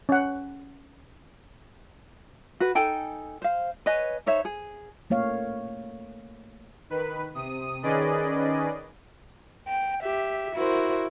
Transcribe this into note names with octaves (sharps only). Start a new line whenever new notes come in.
C#4 F#5
F#4 B4
D#4 A4 G5 G#5
C5 F5
B4 C#5 D#5 G#5
D#4 C5 C#5 E5
G#4
A3 A#3 C#5 F5
D#3 B4
C3 D#6 D#7
D#3 C#4 G#4 B4 D5 D#5
G5
G4 E5
E4 F#4 A#4 C5